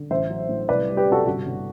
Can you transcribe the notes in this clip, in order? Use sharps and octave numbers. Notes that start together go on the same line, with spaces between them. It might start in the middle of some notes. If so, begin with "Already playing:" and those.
Already playing: D3
A1 C5 E5
F#3
A2
C2 B4 D5
G3
G4 B4
C3 F#4 A4
G1 F#4
G1